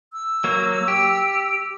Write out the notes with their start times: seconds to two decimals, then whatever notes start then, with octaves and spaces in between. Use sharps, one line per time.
0.13 E6
0.44 F#3 A#3
0.88 G4